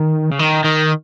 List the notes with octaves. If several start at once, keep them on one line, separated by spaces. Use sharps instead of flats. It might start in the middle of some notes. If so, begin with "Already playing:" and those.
Already playing: D#3
C#3
D#3
D#3